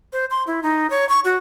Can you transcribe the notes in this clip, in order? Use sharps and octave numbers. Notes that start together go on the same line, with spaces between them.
C5
C6
E4
D#4
C#5
C#6
F#4